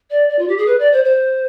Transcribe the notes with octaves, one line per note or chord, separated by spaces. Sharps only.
D5
D5
F4
G4
G#4
B4
D5
C5
C5